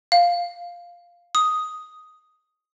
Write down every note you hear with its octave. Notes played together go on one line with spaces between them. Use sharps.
F5
D#6